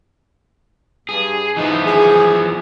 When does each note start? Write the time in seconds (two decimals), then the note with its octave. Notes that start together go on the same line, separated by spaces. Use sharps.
1.09 G2 G#4
1.57 E3 F3 B3 D#4
1.86 G#4